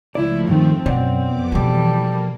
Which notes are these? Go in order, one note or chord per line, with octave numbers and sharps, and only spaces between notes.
C#2 F3 A3 E4 D5
G2 D#3 C4
F#2 B2 C#5 D5 F#5
F2 B3 D6
B2 E3 F3 G3 A4
A#3